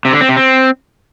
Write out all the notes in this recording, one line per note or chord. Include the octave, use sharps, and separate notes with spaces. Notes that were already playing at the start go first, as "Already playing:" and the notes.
C3
D3
C4
C3
C4